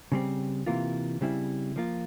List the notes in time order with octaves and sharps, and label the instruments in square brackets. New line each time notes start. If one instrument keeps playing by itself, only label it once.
[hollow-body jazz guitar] C#3 G3 C4
C3 E3 A#3 F4
C#3 G3 C4 E4
F3 A#3 F4